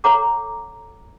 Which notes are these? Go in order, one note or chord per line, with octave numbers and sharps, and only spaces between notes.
A4 C#5 F#5 A#5 D6